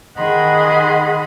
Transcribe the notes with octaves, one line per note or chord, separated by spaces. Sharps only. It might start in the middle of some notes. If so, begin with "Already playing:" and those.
D#3 G#4 D#5 F#5 B5 C6